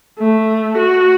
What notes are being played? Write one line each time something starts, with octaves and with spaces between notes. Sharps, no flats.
A3
F#4